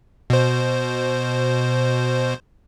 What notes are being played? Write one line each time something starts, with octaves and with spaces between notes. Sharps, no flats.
B2 C5